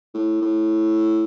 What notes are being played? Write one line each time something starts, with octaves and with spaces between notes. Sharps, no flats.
A2
A2